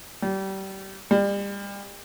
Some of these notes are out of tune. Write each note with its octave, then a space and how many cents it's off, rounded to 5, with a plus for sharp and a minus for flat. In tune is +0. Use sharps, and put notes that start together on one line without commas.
G3 -25
G3 +35